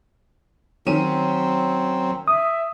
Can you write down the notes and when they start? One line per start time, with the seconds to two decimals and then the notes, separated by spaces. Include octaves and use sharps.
0.86 D#3 F#3 C4 C#4 D#7
2.28 E5 D#6